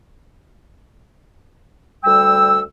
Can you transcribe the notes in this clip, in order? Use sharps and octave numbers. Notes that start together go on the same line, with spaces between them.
D2 G3 G5 E6